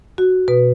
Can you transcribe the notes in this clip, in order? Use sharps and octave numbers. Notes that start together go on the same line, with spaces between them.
F#4
B2 B4